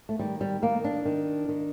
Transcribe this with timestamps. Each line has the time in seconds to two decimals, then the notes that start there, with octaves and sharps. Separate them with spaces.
0.09 A3
0.19 D#3 G3
0.41 G3
0.62 D#3 A#3
0.84 D4
1.05 D#3
1.49 D#3